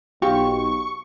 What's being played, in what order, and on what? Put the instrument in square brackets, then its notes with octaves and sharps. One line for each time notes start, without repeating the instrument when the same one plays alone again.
[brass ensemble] B1 [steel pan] F4 [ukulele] G4 [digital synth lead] C#6